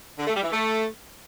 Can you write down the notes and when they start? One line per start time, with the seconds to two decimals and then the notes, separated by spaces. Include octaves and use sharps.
0.19 D3
0.27 A3
0.35 G3
0.43 E3
0.51 A3